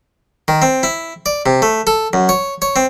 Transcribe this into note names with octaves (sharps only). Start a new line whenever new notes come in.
D#3
C4
E4
D5
C3
A3
A4
F#2
C#5
C#5
C4